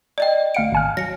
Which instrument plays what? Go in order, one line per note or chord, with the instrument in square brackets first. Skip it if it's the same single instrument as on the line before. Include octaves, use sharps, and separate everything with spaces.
[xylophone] D5 D#5 G5
[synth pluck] D2 F5 C#7 [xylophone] D7
[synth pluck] G#1 G#5 F6
[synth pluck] F#3 [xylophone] A#6 C#7